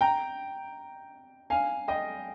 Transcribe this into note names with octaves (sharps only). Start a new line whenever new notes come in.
G5 A#5
F5 G#5
D#5 G5